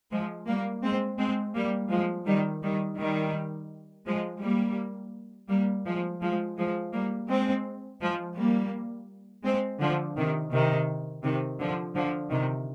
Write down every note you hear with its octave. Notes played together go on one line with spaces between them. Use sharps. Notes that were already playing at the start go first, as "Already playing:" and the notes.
F3 G#3
G3 A#3
G#3 C4
G#3 C4
G3 A#3
F3 G#3
D#3 G3
D#3 G3
D#3 G3
F3 G#3
G3 A#3
G3 A#3
F3 G#3
F3 G#3
F3 G#3
G3 A#3
G#3 C4
F3 G#3
G3 A#3
G#3 C4
D3 F3
C3 D#3
C3 D#3
C3 D#3
D3 F3
D3 F3
C3 D#3